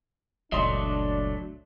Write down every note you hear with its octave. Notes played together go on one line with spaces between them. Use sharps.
F#1 C#2 A#2 F#3 A3 D4 D#5 C6